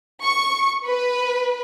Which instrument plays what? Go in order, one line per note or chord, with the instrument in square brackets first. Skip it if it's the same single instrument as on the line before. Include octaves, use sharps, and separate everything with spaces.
[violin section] C#6
B4